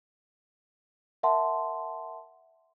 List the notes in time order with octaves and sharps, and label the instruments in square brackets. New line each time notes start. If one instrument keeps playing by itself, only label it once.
[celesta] A#4 E5 F#5 A5 C6